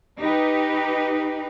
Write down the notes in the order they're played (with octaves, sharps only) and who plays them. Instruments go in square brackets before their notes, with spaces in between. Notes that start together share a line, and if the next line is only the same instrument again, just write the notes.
[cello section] D#4 G4 B4